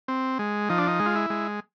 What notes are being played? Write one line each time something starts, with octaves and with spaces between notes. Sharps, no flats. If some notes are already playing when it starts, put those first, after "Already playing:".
C4
G#3
F3 D#4
D4
D#4
G#3
F4
E4
G#3